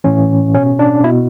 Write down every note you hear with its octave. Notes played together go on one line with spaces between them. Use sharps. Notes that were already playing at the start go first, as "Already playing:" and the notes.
A2 E3 C#4
B2 C#4
D4
B2 E4